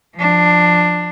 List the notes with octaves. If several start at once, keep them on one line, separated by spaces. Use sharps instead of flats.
F3 D4